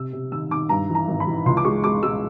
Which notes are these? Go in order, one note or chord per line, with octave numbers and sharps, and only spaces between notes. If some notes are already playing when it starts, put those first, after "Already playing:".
Already playing: C3 E6
C3
D#3 E6
D#3 D6
G2 A#5
E3
A#5
G#1
B5
E3
C#2 C6
D6
G#3 C#6
G#3 D6
G#3 E6